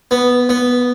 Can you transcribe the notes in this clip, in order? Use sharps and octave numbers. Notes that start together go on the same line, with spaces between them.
B3
B3